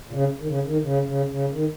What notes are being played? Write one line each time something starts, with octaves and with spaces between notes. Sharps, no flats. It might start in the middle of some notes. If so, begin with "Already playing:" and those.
A#2
C#3
D#3
C#3
D#3
C#3
C#3
C#3
D#3